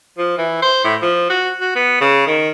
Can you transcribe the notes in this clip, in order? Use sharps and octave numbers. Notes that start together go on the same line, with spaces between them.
F3
E3
C5
A2
F3
F#4
F#4
B3
C#3
D#3